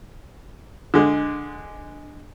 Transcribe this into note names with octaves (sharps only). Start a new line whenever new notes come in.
D3 G#3